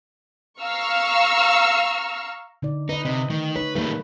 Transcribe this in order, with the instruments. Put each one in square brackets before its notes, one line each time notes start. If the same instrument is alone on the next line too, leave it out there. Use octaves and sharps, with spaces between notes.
[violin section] F5 A#5 C#6 E6 F6
[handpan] D3 D#4 D5
[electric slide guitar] D#4 [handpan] B4 D#5
[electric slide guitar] C3 [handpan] D#5
[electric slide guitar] D#3 [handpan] A3
[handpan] D#4 C#5 [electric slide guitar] B4
[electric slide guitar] D#3 G3 A3 [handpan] A#3 B4